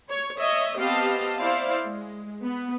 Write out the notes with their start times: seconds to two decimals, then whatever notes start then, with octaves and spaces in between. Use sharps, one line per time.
0.10 C#5
0.39 C#5 D#5 E5
0.76 B3 C4 G4 D#5 F5 A5
1.38 E4 C5 D5 F5
1.84 G#3
2.43 B3